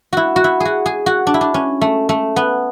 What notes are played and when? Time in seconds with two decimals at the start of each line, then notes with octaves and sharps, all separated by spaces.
0.13 E4 F#4
0.36 F#4
0.44 E4
0.60 G#4
0.65 F#4
0.86 G#4
1.06 F#4
1.27 D4
1.34 E4
1.41 D4
1.54 C#4
1.81 A3
2.09 A3
2.36 B3